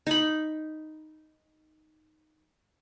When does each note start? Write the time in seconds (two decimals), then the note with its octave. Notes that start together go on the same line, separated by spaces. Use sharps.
0.07 D#4 B5